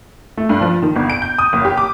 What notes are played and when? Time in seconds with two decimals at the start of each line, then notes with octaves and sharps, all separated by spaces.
0.37 A3
0.49 G2
0.61 F3
0.82 D#3
0.96 G1
1.10 D7
1.22 G6
1.38 D#6
1.53 F#1
1.65 G4
1.77 D6